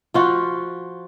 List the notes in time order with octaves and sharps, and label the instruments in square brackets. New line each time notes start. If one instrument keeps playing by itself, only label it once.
[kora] F3 F4 F#4